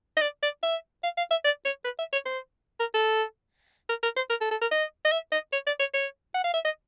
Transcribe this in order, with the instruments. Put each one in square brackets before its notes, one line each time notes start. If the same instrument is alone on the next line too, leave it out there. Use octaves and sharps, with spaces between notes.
[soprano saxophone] D#5
D5
D5
E5
F5
F5
E5
D5
C#5
B4
E5
C#5
C5
A#4
A4
A#4
A#4
C5
A#4
A4
A4
A#4
D#5
D#5
E5
D#5
C#5
D5
C#5
C#5
F#5
F5
E5
D#5